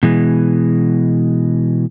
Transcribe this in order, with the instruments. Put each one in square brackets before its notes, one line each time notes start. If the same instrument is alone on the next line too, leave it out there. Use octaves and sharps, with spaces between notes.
[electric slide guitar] B2 E3 G#3